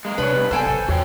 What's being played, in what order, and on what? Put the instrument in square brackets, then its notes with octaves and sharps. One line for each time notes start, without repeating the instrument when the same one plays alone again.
[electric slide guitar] G#3 A#3
[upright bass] C3 [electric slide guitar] D4 C#5 [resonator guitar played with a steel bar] B4
[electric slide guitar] B2 G3
[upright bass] B3 [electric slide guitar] A4 [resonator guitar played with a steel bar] C5 G5 G#5
[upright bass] A1 C#3
[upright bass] E2 D3 [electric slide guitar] F#4 C#5 G5